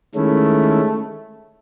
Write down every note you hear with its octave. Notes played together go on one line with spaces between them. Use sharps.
D#3 G#3 A3 C#4 E4